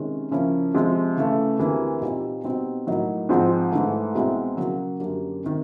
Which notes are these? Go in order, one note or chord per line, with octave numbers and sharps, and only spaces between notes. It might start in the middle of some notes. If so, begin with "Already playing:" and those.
Already playing: C3 D#3 G#3 C#4
C#3 F3 A#3 C#4 E4
C3 F3 G#3
C#3 E3 A3
D2 C3 E3 G3 A#3
A#2 G3 C4 D#4
B2 G3 C4 D#4
A2 F#3 A#3 D#4
G#2 F3 G#3 C4 F4
G#2 E3 A3
C2 B2 G#3 C4 E4
C#3 F#3 A#3
F#2 D3 G3 A#3
C3 D#3